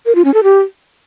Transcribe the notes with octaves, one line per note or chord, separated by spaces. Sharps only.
A#4
F4
C#4
A4
G4